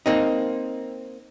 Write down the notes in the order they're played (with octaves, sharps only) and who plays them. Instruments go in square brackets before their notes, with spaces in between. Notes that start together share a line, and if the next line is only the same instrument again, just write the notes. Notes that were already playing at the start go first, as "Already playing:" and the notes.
[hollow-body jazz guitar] A#3 C4 D#4